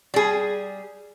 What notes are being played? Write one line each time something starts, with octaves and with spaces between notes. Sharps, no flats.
G3 G#4